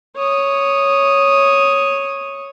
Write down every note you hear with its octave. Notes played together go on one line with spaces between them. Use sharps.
C#5 D#6